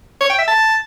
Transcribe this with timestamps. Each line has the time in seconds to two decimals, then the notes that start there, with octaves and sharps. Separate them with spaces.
0.21 C#5
0.30 G5
0.39 E5
0.48 A5